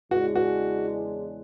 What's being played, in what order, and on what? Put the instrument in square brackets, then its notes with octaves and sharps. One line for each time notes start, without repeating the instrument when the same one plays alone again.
[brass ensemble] E2 C#3 G#3 D4 [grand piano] F#4
[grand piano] F#4